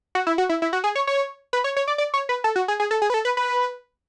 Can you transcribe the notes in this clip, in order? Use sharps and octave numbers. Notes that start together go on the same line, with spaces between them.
F#4
E4
F#4
E4
E4
F#4
G#4
C#5
C#5
B4
C#5
C#5
D5
D5
C#5
B4
A4
F#4
G#4
G#4
A4
G#4
B4
A4
B4
B4